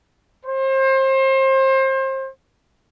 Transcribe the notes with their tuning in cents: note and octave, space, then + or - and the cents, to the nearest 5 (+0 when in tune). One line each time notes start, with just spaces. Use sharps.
C5 +30